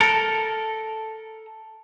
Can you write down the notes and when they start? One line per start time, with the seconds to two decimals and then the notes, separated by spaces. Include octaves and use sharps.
0.01 A4 A#4